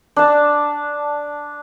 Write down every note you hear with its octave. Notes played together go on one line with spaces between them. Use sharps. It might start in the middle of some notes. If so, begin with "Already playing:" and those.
D4 A5